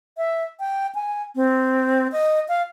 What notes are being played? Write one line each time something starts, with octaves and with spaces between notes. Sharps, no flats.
E5
G5
G#5
C4
D#5
F5